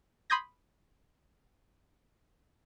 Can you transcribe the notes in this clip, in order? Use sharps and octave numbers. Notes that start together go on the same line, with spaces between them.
B5 C6 D#6 G6 G#6 A#6